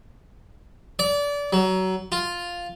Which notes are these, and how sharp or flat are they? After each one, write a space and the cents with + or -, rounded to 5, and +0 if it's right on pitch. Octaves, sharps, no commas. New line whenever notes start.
D5 -25
F#3 +25
F4 +0